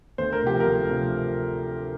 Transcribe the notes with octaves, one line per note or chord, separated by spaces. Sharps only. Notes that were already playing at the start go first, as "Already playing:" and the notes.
D2 C5
A#4
C3 F3 G4
A#4
D2
C3 F3